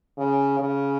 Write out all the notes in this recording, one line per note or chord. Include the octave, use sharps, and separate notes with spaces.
C#3
C#3